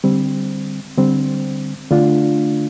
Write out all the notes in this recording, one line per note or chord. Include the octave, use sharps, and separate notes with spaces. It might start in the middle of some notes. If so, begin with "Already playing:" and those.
D3 G3 C4
D3 G3 C4
D3 A3 D4 F4